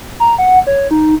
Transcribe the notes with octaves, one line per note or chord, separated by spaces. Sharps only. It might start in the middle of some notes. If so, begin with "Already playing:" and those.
A#5
F#5
C#5
D#4